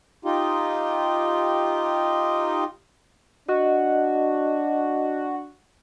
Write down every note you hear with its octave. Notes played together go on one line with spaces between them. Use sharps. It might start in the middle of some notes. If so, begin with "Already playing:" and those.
D#4 F4 G4
D4 F#4 D#5